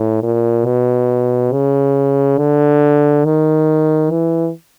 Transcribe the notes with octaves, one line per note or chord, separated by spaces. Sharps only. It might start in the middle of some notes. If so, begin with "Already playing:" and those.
Already playing: A2
A#2
B2
C#3
D3
D#3
E3